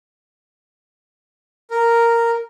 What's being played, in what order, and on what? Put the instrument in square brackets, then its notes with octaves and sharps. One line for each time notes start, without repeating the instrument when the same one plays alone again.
[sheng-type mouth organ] A#4